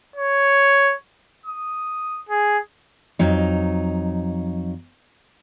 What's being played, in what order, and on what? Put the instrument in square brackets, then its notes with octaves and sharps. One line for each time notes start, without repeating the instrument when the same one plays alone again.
[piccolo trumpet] C#5
D#6
G#4
[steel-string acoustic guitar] F2 F#3 D#4